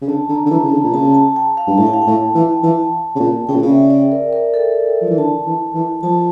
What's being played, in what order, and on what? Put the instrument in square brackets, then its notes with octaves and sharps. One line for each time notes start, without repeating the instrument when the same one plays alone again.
[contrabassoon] C#3
[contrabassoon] D3 [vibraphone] A5
[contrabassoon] D3 [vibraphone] A#5
[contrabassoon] D3
[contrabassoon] E3 [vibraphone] A5
[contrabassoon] C#3
D3
A#2
[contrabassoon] C#3 [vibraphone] A5
[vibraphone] A5
G5
F5
[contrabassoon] G2
[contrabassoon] A2 [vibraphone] A5
[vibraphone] G5
F5
G5
[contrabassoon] A2
E3
[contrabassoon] E3 [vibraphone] A5
[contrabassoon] C#3
A#2
[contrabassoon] C#3 [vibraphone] G5
[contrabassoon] A#2
[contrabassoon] C#3 [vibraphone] D5
[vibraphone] E5
D5
A#4
A#4
A4
[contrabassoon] F3
E3
[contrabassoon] D3 [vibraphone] A5
[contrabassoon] E3
E3
[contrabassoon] F3 [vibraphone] A5